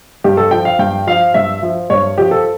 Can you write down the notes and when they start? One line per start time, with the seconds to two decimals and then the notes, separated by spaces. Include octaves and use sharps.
0.24 G2 G4
0.37 A4
0.51 F3 G5
0.65 F5
0.79 G2 G5
1.07 F3 F5
1.34 G2 E5
1.63 F3
1.90 G2 C#5
2.18 F3 G4
2.31 A4